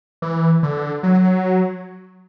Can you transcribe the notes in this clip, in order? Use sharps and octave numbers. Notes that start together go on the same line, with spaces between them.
E3
D3
F#3